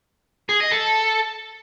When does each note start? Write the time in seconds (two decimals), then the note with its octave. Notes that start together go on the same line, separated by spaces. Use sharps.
0.49 G#4
0.60 D#5
0.71 A4